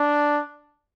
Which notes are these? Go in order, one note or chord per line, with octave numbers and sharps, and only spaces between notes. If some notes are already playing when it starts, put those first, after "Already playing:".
Already playing: D4